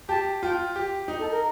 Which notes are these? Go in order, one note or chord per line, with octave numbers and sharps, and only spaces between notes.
G4 A5
F4 G5
G4
D#4
A4
A#4